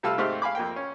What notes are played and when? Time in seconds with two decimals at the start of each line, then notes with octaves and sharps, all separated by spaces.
0.03 C3 G3 F4 A4 E6 F6
0.18 G#2 A3 C4 G4 F5 F6
0.42 F5 G#5 B5 D6
0.55 F2 A#3 G5
0.76 C#4